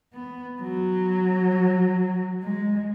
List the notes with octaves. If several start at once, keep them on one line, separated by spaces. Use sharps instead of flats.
B3
F#3
G#3